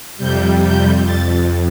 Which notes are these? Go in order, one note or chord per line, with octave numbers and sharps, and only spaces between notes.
F2 C3 G3 G6
G6
F2 A6